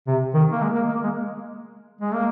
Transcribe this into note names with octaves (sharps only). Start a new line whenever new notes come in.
C3
D#3
A#3
G#3
A#3
A#3
G#3
G#3
A#3